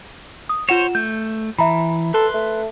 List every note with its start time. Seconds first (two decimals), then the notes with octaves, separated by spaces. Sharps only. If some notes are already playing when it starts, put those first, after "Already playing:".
0.49 D#6
0.69 F4 C5 C#5 F#5 E7
0.95 A3 G6
1.59 E3 E5 A#5 B5
2.14 A4 B4 C6
2.34 A3